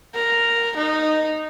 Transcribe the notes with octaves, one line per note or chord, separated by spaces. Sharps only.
A#4
D#4